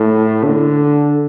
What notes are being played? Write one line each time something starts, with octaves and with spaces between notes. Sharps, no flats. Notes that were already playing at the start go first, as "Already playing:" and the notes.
Already playing: A2
D3